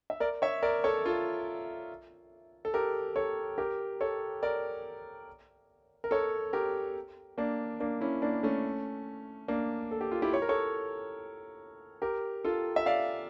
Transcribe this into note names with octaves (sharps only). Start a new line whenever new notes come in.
E5
A#4 D5
C#5 E5
A#4 D5
A4 C#5
F4 A4
A4
G4 A#4
A4 C#5
G4 A#4
A4 C#5
A#4 D5
A#4
A4 C#5
G4 A#4
A#3 D4
A#3 D4
C#4 E4
A#3 D4
A3 C#4
A#3 D4
A4
G4
F4
E4 G4
C#5
A#4
A4 C#5
G4 A#4
F4 A4
E5
D5 F5